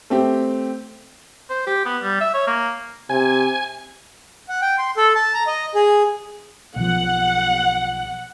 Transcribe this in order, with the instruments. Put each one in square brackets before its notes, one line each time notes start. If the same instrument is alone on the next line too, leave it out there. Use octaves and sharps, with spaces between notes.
[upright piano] A3 C4 G4
[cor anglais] C5
G4
B3
G3
E5
C#5
A#3
[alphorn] C3 [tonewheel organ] G#5
[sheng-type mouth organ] F#5
G5
C6
A4
A5
A#5
D#5
G#4
[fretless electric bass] B1 F3 [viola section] F#5